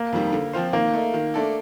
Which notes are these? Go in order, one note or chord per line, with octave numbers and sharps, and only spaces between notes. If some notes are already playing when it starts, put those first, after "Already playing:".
Already playing: A#3
F2 D#3 G3
D3
F3 C4 F4 C5
D#3 A#3
A3 D#4
D#3
A3 D4 A4